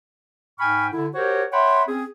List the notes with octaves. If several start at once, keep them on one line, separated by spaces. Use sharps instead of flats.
G#2 G5 G#5 B5 C#6 F6
D3 E4
F#4 G4 A#4 C5 C#5
C#5 E5 F#5 G5 B5 C6
C4 C#4 G#4